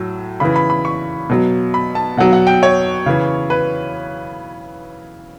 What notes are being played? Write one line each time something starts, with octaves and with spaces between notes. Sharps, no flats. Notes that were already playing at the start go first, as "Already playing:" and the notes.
Already playing: A2 F#3
C#3 E3 B5
B5
B5
C#6
B2 F#3
B5
A5
B2 F#3 F#5
F#5
G5
C#5
C#3 E3
B4